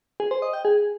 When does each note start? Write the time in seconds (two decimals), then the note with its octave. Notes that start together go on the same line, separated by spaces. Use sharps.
0.20 G#4
0.31 C5
0.42 D#5
0.53 G5
0.65 G#4